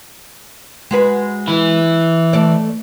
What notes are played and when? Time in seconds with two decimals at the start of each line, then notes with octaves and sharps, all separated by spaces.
0.91 G#3 F#4 B4
1.48 E3 E4
2.33 A3 D5